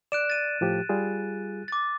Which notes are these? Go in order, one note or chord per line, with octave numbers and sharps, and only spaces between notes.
D5 F#6 D7 E7
A6 D#7
A2 F3 G4
G3 F4 G#4
D6 A6